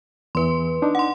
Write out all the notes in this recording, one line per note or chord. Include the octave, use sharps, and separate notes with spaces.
E2 E3 B4 C6
D4 D#4
F#5 C6